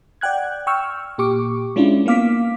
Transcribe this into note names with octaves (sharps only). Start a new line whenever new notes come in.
D5 F#5 G5 F#6 G#6
G5 C#6 E6 F6
A#2 G4 C#6 D6
G#3 C#4 D4 E4 F4
A#3 B3 F5 D6 B6